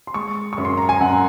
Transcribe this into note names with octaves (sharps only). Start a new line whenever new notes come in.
C6
G#3 C#6
F#2 C#6
C6
A#5
G#5
F#2 F#5